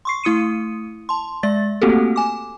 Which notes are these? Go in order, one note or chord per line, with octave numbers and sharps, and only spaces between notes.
C6 C#6 C7
A3 E4 D#6 C#7 D#7
A5 C6
G#3 D5 A6
A3 A#3 C4 F#4 G4 A4
G#5 D6